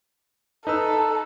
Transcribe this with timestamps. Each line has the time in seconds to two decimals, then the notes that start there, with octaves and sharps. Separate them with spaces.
0.67 D#4 A4 B4 E6